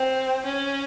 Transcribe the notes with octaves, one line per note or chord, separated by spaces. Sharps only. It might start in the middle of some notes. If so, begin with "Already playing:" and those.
Already playing: C4
C#4